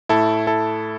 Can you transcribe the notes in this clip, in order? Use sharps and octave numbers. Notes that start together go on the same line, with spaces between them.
A2 A3 E4 A4
E4 A4